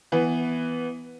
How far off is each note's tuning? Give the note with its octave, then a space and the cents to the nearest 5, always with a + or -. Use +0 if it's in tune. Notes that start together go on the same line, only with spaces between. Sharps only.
E3 +0 B3 +0